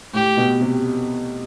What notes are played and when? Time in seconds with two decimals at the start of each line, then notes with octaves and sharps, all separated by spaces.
0.13 A2 G4
0.37 B2
0.61 C3